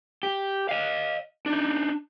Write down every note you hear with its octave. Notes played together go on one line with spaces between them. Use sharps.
G4
D#5 F5
D4 D#4